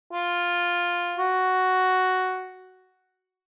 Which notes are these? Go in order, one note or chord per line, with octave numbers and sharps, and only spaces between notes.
F4
F#4